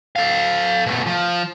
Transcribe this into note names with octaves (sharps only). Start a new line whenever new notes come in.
A4 F5
B2 A3
F3